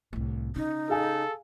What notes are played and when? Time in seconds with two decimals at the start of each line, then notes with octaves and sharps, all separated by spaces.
0.13 C2 A2
0.56 C#3 D#4
0.90 G#4 A4 F5 G#5